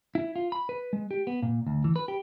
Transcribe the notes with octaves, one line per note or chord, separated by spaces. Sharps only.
E4
F4
B5
B4
G#3
G4
B3
A#2
D2
E3
B4
G4